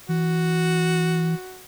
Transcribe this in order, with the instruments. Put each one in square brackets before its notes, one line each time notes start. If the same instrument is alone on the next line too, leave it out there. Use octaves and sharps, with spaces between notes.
[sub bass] E3 [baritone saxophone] F#4